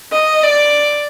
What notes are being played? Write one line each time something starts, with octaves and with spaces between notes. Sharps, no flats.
D#5
D5